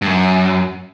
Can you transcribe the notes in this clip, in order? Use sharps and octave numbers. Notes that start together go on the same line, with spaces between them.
G2
F#2